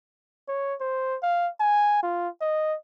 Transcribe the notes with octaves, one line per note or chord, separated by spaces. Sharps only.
C#5
C5
F5
G#5
F4
D#5